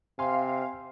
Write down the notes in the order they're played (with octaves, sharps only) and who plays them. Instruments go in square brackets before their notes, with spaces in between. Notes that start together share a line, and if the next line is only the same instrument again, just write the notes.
[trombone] C3 [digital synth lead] F5 [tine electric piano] G#5 C6